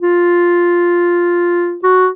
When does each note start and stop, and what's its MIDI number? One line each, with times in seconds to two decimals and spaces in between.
0.02 1.78 65
1.83 2.09 66